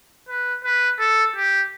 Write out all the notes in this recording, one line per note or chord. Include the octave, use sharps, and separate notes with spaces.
B4
B4
A4
G4